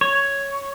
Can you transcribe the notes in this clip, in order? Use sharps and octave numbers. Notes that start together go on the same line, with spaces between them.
C#5